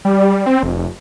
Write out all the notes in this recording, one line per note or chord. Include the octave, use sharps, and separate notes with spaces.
G3
C4
F1